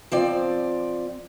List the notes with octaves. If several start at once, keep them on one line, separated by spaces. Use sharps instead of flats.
F3 C4 D5